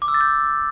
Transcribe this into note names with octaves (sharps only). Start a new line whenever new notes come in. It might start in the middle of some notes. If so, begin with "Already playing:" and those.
D6
E6
A6
G6